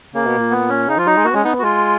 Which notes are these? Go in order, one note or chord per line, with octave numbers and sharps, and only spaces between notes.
C#3 A#3
B2
A#2
B3
C#4
C#3 D#4
F3 F4
F#3 D#4
G#3
A#3 F#4
B3
G#3 C#4
B3 D#4
B3
F#4
G#3 F4